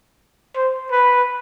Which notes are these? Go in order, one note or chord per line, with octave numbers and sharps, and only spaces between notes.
C5
B4